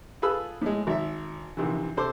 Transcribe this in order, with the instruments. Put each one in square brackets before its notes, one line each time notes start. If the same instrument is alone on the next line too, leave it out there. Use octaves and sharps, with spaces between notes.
[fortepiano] F4 G#4 A4 B4 B5 E6
A2 G#3
G#1 E5
A#1 C3 D#3 E3
C3 A4 C5 C6 D6